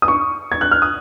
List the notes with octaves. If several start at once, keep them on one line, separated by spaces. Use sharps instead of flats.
D#6
C#6
G#6
F#6
F6
D#6